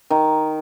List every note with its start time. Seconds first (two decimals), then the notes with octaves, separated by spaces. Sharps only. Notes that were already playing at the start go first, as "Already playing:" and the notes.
0.10 D#3